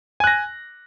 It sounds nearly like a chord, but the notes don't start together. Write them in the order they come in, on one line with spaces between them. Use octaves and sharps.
G#5 F#6 A#6